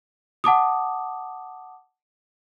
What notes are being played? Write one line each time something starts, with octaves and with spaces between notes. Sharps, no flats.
F#5 A5 D6 D#6